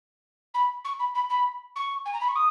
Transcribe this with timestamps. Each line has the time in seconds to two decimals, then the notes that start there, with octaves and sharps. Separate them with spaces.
0.54 B5
0.84 C#6
0.99 B5
1.14 B5
1.30 B5
1.76 C#6
2.05 G#5
2.13 A#5
2.21 B5
2.28 C#6
2.35 D#6